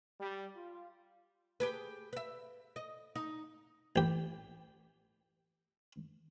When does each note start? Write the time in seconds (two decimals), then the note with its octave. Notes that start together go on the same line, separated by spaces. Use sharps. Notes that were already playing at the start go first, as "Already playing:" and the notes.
0.19 G3
0.56 F4
1.60 G4 G#4 B4
2.13 B4 E5
2.76 D#5
3.16 D#4
3.96 A1 G4